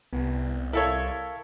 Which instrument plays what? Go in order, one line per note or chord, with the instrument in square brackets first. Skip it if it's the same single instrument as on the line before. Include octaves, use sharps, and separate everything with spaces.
[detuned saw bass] C2 [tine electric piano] B3
[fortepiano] E4 A4 C#5 [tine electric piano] A#4 F5